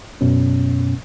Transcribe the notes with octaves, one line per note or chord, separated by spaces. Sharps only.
F#2 B2 C#4